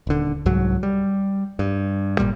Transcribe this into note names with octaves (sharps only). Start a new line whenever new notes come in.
D#1 D3
C2 G#2 F#3
G3
G2
G#1 D#2 A#2 G3